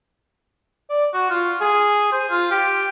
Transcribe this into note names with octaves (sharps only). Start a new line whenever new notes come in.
D5
F#4
F4
G#4
C5
F4
G4